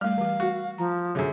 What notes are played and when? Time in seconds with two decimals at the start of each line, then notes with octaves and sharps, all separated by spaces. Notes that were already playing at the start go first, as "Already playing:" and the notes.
0.01 G3 A3 F5 F6
0.18 E3 G4
0.40 F#4
0.78 F3 A#5
1.15 F#2 D3 F#3 G#4 E5